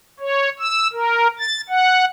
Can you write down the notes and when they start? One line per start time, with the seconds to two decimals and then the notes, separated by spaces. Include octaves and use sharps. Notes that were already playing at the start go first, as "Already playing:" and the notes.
0.20 C#5
0.60 E6
0.93 A#4
1.39 A6
1.69 F#5